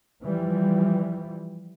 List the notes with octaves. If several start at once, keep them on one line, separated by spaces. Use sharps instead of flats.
E3 F3 G3